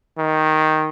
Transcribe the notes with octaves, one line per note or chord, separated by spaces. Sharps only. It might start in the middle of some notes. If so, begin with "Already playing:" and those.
D#3